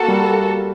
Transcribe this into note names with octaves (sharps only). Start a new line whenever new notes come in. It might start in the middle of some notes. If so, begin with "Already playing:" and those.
Already playing: A#3 F#4 A4
G3